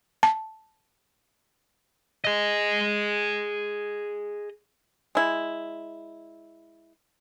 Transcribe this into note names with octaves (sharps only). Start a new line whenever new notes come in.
A5
G#4 D#5
G#3 E4